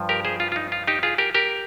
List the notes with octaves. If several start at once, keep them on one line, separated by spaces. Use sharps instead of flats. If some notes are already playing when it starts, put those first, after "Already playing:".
Already playing: G2 F3
G4 A#4
G#4 C5
F4
F4
D#4
F4
D#4 G4
F4 G#4
G4 A#4
G4 A#4